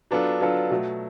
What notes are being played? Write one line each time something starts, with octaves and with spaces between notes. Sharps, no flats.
F#3 B3 D4 F4 A4
F#3 B3 D4 F4 A4
B2 F#3 A3